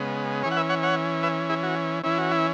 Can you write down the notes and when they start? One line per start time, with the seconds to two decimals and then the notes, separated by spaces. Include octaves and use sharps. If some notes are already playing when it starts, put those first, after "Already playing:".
Already playing: C#3 G#3 B3
0.43 E3 C#4 G#4 C#5
0.51 F#5
0.57 B4 E5
0.70 C#5 F#5
0.83 C#5 F#5
1.23 B4 E5
1.50 E4 G#4
1.63 F#4
2.03 E3 C#4 E4
2.18 F#4
2.31 E4